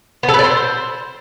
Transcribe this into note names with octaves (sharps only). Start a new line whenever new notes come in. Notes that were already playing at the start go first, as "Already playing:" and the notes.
B3
A4
B4
D5
C5